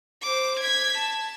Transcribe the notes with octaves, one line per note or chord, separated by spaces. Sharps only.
C5 D6
G#6 B6
A5